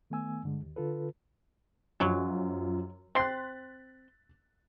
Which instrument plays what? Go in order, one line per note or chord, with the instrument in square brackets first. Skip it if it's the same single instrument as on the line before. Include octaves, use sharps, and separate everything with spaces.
[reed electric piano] D#3 A3 B3 G#5 E6
G2 D3 G#3
D#2
D3 F4 A4 B4
[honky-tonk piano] F#2 F3 F4 [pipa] F#3 G#3
[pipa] C4 C6 [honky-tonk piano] F#6 A6 B6